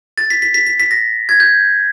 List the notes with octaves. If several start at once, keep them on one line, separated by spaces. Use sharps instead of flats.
A6
B6
B6
B6
B6
B6
A#6
G#6
G6